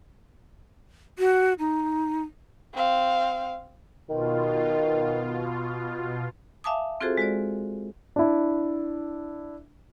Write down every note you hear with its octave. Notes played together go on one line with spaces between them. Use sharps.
F#4
D#4
C4 F5
B2 D#3 F4
E5 F5 G#5 A5 D6 D#6
C4 F4 F#4 G#4 A4 C5
G#3 F#4 C5 D5
D4 E4